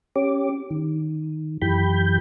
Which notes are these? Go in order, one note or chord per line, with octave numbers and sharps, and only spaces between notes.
C#4 G4 D6
D#3
F#2 E3 G4 B5 G6